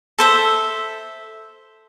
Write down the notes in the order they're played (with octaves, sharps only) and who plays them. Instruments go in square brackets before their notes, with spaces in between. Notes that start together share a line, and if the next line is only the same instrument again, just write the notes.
[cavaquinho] A4 C5 E5